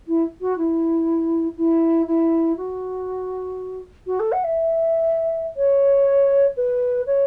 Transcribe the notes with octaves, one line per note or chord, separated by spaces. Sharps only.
E4
F#4
E4
E4
E4
F#4
F#4
A4
F#5
E5
C#5
B4
C#5